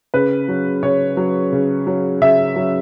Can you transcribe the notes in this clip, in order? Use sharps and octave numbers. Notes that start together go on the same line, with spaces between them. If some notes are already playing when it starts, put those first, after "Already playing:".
C#3 B4
F#3
C#3 C#5
F#3
C#3
F#3
C#3 E5
F#3